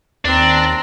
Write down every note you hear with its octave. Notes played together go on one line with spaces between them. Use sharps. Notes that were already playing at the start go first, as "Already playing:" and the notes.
D#2 C4 D4 A#5